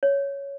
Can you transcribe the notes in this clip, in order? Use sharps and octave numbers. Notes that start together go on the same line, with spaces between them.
C#5